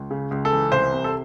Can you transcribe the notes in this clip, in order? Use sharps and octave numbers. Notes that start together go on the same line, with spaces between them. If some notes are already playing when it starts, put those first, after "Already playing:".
Already playing: C#2
C#3
C#2
A4
E3
C2 C5
C3
A4